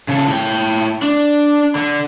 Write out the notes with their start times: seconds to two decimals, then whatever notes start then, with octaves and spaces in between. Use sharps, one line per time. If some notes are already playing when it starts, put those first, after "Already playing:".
0.08 C#3 A4
0.28 A2 G5
1.03 D4
1.75 D3